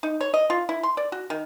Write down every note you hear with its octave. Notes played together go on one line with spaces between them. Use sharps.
D#4
C#5
D#5
F4
E4
C6
D5
F#4
D#3